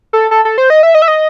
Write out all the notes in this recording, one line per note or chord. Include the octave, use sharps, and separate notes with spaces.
A4
A4
A4
C5
D#5
E5
D#5
E5
D#5